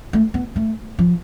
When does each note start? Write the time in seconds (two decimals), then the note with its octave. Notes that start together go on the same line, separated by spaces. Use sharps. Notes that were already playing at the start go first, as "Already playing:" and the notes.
0.13 A3
0.34 B3
0.56 A3
0.99 F3